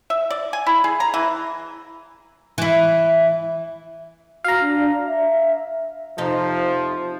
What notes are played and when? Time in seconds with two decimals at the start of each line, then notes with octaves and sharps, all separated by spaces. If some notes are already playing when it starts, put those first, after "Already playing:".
0.10 E5
0.31 D5
0.53 G#5
0.67 E4
0.84 G#4
1.00 A#5
1.14 E3
2.58 E3 E4
4.44 F#4 F5 A#5
4.60 D4
5.07 E5
6.18 F2 C3 F3 D#4